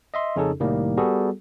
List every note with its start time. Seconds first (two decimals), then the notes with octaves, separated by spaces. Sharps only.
0.14 D#5 E5 C6
0.36 F2 C#3 C#4 D#4 G#4 A4
0.60 C2 A2 D#3 G3 A#3
0.97 G3 B3 F#4 G#4 A4